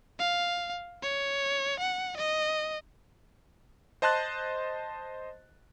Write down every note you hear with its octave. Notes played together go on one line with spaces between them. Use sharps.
F5
C#5
F#5
D#5
C5 D#5 A5 C6 F#6 A6